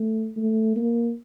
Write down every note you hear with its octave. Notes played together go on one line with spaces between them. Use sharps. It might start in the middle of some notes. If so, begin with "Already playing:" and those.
Already playing: A3
A3
A#3